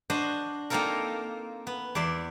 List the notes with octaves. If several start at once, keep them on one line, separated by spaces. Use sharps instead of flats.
D4 F#4 C5 D#5
A#3 C4 D#4 F4 A4 A#4
B3
E2 D5 E5 C6